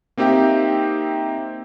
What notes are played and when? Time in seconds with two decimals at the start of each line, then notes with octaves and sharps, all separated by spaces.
0.17 A#3 C4 D#4 G4 E5 G5